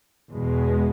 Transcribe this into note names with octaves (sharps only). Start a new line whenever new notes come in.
E2 B2 G#3